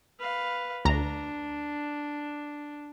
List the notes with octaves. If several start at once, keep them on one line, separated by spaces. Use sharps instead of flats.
B4 F5
D2 D4 A#5